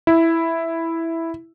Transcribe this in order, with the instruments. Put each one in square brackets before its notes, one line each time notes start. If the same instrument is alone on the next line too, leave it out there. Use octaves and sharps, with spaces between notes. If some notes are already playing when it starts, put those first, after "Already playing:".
[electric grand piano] E4